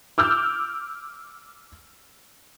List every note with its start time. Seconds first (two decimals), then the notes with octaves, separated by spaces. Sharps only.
0.18 D6 E6 F6 G6